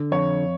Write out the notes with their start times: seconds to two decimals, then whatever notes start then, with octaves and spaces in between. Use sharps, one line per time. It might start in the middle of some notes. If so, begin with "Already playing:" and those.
Already playing: D3
0.12 F2 C#5